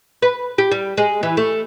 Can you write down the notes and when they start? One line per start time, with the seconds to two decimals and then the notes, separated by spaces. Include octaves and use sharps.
0.22 B4
0.58 G4
0.71 G3
0.97 G#3
1.23 E3
1.37 A3